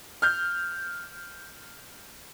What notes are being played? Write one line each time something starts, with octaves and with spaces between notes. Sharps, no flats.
F6 G6